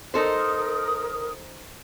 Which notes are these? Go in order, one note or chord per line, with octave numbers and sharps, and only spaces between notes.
D#4 A4 A#4 C5 D#6